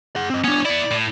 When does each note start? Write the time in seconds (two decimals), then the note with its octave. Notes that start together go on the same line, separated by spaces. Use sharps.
0.16 G#4 F#5
0.30 C4 D#5
0.44 B3 C#4 D4 C#5
0.65 B3 E4 D5
0.91 A2